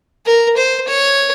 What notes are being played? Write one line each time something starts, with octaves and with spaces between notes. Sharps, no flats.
A#4
C5
C#5